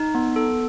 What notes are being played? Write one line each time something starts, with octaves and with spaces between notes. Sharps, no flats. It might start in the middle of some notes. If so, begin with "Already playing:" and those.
Already playing: D#4
B3
A4